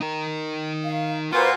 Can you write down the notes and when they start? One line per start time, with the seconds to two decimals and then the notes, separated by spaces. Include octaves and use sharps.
0.01 D#4 A#4
0.84 F5
1.33 A#2 F4 F#4 B4 C5 F5